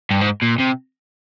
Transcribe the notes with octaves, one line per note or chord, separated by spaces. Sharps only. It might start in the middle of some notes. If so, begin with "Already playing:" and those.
G2
G#2
A#2
C3